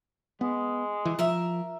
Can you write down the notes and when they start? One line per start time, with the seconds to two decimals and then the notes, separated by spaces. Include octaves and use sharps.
0.41 G#3 B3
1.05 E3
1.19 F3 A#4 E5